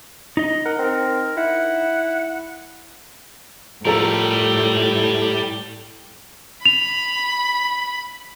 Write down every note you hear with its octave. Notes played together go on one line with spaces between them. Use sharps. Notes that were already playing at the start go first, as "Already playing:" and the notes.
D#4 D#5
A#4 F#5
C4 A#4
E4 F#5
A2 F3 G3 A4 A#4 A#5
B5 F7